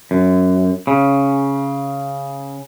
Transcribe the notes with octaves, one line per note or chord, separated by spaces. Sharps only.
F#2
C#3